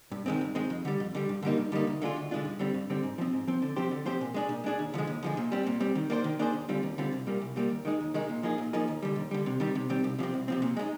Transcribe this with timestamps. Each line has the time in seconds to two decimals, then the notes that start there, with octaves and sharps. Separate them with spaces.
0.12 G2
0.26 D#3 G#3 C4
0.41 G2
0.55 D#3 G#3 C4
0.70 F2
0.85 D3 G3
1.00 F2
1.15 D3 G3
1.29 G2
1.43 D3 G3 A#3 D#4
1.57 G2
1.72 D3 G3 A#3 D#4
1.87 D2
2.02 D3 G#3 D4 F4
2.16 D2
2.31 D3 G#3 D4 F4
2.45 G2
2.59 D3 G3 C4
2.74 G2
2.90 D3 G3 C4
3.03 G#2
3.18 F3 C4
3.33 G#2
3.47 F3 C4
3.62 D3
3.76 F3 C4 G4 C5
3.91 D3
4.06 F3 C4 G4 C5
4.21 A#2
4.34 G#3 D4 G#4
4.49 A#2
4.64 G#3 D4 G#4
4.79 D#2
4.94 D3 F3 G#3
5.07 D#2
5.23 D3 F3 G#3
5.37 A#2
5.52 G3 C4
5.67 A#2
5.80 G3 C4
5.95 D#3
6.10 A#3 D4 G#4 C5
6.24 D#3
6.39 A#3 D4 G#4 C5
6.53 D#2
6.69 D3 G3 C4 F4
6.83 D#2
6.98 D3 G3 C4 F4
7.13 C2
7.26 A#2 G3 A#3
7.41 C2
7.56 A#2 G3 A#3
7.70 D#2
7.85 D#3 G#3 D#4
8.00 D#2
8.14 D#3 G#3 D#4
8.29 A#2
8.43 F3 A#3 D#4 G#4
8.58 A#2
8.73 F3 A#3 D#4 G#4
8.88 D#2
9.02 D3 G3
9.16 D#2
9.31 D3 G3
9.46 C3
9.60 D#3 G3 C4
9.75 C3
9.89 D#3 G3 C4
10.04 C2
10.19 C3 F3 C4
10.34 C2
10.48 C3 F3 C4
10.62 A#2
10.77 G#3 C4 D#4